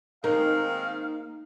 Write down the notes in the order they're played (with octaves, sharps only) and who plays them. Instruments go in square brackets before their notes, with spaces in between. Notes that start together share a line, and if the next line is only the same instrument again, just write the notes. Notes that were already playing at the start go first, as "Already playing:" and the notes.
[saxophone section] D#3 G#3 C4 [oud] A#3 [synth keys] D#4 [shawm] F5